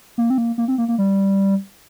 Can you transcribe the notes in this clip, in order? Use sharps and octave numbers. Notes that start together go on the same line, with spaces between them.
A#3
C4
A#3
A#3
C4
A#3
A#3
G3